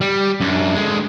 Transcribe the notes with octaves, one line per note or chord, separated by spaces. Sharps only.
G3
F#2 D4
D3 G#3